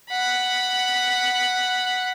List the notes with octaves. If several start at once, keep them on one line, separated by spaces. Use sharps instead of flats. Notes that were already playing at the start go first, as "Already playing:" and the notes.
F#5 B5